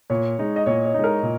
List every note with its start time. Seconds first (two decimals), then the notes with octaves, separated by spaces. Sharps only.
0.10 A#2 C#5
0.39 G#3 D#4
0.56 D#5
0.66 A#2 C#5
0.85 C#5
0.94 G#3 D#4
1.04 A#4
1.23 A#2